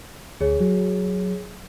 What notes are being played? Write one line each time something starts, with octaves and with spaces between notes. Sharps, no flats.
D2 G#4 C#5
F#3